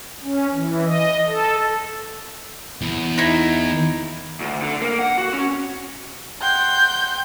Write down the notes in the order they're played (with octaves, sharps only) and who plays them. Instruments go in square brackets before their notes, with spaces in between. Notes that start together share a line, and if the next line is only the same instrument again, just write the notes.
[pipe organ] C#4
E3
D#5
A4
[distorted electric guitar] E2
[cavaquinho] D#4 E4
[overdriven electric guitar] D2
D3
A#3
F#5
F#4
C#4
[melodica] F#5 G5 C6 [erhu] G6